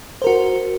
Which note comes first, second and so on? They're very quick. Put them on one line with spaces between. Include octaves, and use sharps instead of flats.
C5 A#4 F#4